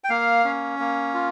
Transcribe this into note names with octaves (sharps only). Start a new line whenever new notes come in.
G5
A#3 F5
C#4
A#3
F4